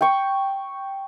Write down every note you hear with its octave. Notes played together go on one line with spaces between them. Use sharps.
G5 C#6